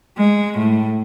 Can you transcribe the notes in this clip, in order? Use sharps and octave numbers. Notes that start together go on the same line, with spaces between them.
G#3
A2